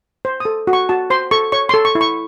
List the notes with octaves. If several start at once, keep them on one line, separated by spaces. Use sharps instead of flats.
C5
A4 D#6
F#4
C#6
F#4 A5
C5 C6
A4 C#6
C#5 C#6
A4 C6
C#6
E4
C#6